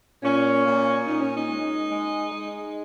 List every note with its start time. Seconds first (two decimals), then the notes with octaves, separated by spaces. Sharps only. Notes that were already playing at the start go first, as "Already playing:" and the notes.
0.23 A#2 C#4
0.66 A#2
1.07 A#2 D#4
1.20 C#4
1.34 D#4
1.49 G#3
1.91 G#3
2.33 G#3